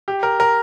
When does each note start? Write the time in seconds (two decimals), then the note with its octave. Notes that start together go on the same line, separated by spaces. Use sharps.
0.08 G4
0.23 A#4
0.40 A#4